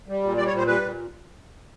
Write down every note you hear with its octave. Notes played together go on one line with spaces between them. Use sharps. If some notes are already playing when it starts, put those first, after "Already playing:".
G3
A#2
G3 D5
C#5
A#2
C5
G3 B4
A#2